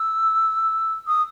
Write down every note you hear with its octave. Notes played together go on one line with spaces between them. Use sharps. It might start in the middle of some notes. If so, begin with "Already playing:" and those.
Already playing: E6
D#6